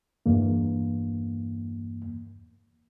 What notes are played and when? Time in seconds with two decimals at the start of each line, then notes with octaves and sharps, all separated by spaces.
0.26 E2 G2 A#3